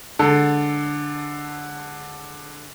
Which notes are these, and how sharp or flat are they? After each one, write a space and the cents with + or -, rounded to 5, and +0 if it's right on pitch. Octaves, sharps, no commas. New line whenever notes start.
D3 +0 G#3 +0 A4 +0